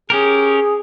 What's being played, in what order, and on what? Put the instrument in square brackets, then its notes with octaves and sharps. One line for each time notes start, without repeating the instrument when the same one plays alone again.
[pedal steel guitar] C#4 G4 A#4 [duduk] G#4